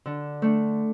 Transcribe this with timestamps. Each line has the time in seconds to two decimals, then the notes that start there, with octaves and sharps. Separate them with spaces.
0.06 D3
0.42 A3 D4